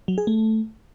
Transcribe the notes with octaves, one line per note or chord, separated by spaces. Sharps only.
F#3
G#4
A3